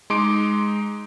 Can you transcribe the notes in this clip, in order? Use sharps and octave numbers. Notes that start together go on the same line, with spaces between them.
G#3 D#4 C6 D6 D7